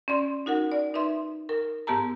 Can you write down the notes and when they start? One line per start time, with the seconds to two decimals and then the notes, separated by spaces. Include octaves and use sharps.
0.08 C#4 D5 C6
0.46 D#4 F#4 A#4 F#5
0.72 D5
0.94 D#4 B4 E5 C6
1.49 A#4
1.87 G#2 B3 G4 A5 A#5